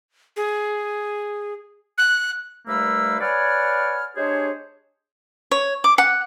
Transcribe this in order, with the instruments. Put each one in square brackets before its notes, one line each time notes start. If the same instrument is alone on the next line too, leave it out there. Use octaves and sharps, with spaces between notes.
[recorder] G#4
F#6
[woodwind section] D#2 G3 A3 A#3 B4 E6
B4 C#5 D5 F#5 G#5 F6
G#3 D4 G4 G#4 C5 C#5
[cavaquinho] C#5
D6
F#5